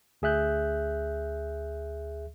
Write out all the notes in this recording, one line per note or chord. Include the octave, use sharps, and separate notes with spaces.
D2 G#4 E5 F#6 G6